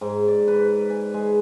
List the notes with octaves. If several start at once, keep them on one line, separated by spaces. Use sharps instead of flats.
G#2
D5
B4
G#5
G#3